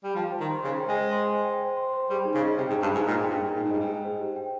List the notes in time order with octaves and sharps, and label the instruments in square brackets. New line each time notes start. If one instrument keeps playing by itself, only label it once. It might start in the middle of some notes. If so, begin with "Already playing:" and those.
[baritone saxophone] G3
[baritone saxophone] F3 [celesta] G5
[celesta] C5
[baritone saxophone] D#3
[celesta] C6
[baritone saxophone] C#3 [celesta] C5
[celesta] G5
[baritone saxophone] G#3
[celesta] C5
C6
C5
G5
C5
C6
C5
[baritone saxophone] G3 [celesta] G#4
[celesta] D#4
[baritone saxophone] C#3
[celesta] D#5
[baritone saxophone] C3 [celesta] G5
[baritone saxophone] G#2
[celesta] G#4
[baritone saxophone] G2
[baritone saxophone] G#2 [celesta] D#4
[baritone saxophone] A#2 [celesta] D#5
[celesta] G5
[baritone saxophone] G2
[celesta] G#4
[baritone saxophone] A#2 [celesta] D#4
[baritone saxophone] G#2
[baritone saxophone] G2 [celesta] D#5
[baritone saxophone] G#2
[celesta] G5
C5
G4
G5